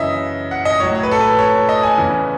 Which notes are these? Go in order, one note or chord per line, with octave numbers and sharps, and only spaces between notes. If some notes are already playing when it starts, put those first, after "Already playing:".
Already playing: F#2 C#3 E3 D#5 E5
F#5
D#5
A2 F#3 C#5
C#5
B4
A4
B4
C#5
D#5
G#5
E2 C#3 E3